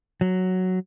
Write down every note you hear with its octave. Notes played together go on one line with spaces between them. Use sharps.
F#3